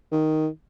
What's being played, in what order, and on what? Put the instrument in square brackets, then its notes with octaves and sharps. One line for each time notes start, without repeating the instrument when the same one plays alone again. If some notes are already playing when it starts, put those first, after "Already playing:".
[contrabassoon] D#3